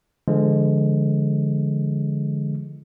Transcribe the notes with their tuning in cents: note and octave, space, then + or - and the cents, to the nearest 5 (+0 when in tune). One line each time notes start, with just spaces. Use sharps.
D3 +0 F3 -35 G#3 +0